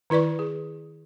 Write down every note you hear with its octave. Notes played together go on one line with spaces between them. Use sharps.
D#3 E4 B4 D5 C#6
G#4